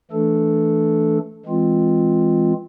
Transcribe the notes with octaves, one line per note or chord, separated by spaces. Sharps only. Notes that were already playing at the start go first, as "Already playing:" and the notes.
E3 A3 D4 A4
E3 G#3 C4 F4